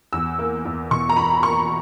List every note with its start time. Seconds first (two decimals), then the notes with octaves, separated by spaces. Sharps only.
0.13 E2 E6
0.39 A#3
0.65 E2
0.91 B2 C#6
1.09 A#5
1.17 E2 B5
1.43 A#3 C#6